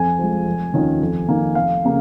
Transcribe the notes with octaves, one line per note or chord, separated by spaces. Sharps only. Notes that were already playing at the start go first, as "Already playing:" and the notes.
Already playing: F2 G#5
F3 G#3
F1
D#2 D#3 C#4 F4
F2
D#3 A#3 D#4
F1 F5
C#3 A#3